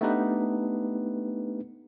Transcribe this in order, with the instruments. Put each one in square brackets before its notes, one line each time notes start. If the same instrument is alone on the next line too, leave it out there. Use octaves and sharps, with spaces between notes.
[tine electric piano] A3 B3 D4 D#4 G4 B4